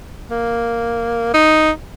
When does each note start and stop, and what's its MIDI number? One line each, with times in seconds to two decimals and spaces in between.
0.30 1.30 58
1.34 1.71 63